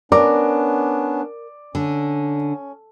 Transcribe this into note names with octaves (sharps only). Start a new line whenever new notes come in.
B3 C#4 D4 A#4 D5 D6
D3 C#4